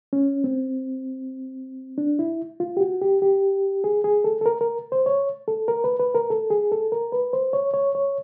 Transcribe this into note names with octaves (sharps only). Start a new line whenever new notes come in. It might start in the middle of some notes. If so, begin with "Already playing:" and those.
C#4
C4
D4
E4
F4
G4
F#4
G4
G4
G#4
G#4
A4
A4
A#4
A#4
C5
C#5
A4
A#4
B4
B4
A#4
A4
G#4
A4
A#4
B4
C5
C#5
C#5
C#5